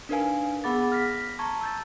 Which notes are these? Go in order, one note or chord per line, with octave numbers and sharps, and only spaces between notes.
D4 D#4 A#4 B4 F5 G#5
B3 G#4 F#5 B5 D6 A6
F6 A#6 B6
A5 A#5 C#6 G#6
E6 G6 A6